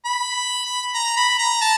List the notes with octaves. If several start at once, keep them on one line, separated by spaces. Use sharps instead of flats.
B5
A#5
B5
A#5
A5